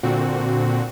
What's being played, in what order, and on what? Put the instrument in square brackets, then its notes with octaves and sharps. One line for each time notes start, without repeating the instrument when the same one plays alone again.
[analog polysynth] A#2 D3 C4 F#4